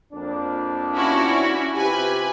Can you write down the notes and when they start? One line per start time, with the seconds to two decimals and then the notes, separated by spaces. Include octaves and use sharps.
0.13 F2 A#3 D4
0.95 C#4 E4 F#4
1.75 C3 F4 G4 B4 G#5